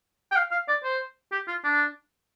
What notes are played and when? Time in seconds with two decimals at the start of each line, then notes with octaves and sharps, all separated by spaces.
0.32 G5
0.36 F5
0.51 F5
0.68 D5
0.84 C5
1.32 G4
1.48 F4
1.64 D4